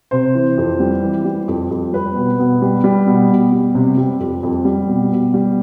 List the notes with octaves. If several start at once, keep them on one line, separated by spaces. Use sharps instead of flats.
C3 C5
E3
F2
G3
E3
G3
F2
F2
G3 B4
B2
B2
G3
G3
B2
B2
G3
C3
G3
F2
F2
G3
B2
B2
G3